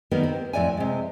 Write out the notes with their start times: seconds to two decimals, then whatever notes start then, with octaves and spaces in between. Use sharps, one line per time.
0.11 D#3 G3 A#3 B3
0.23 C4
0.53 F2 A2 D5 E5 G#5
0.77 C3 G#3